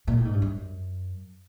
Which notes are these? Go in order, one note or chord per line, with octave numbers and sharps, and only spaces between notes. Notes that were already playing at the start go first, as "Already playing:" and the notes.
A#2
A2
G#2
G2
F#2